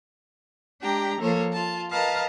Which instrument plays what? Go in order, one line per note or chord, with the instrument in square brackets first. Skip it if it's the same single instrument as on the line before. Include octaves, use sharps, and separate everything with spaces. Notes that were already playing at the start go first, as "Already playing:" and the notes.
[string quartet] G#3 D4 G4 G5 A#5
F3 A#3 A4 C#5
F4 A5
A#4 B4 D#5 F5 A5 A#5